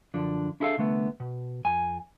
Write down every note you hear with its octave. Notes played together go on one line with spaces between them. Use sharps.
F#2 D3 F3 D4
D4 E4 G#4 A4 E5 F5
C2 D3 A3 B3
B2
F2 G#5